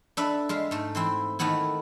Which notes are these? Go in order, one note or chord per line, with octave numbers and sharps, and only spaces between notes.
D4 A4 B4 E5
G#3 E5 F5
G#2 A3
E3 C4 E4
D#3 E3 A3 B3 E4